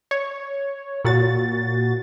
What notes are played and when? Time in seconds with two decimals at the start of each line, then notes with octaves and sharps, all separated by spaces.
0.11 C#5
1.05 A#2 F#4 A6